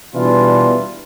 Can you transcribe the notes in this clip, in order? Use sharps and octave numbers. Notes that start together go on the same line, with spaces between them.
B2 E3 G3 D4 F4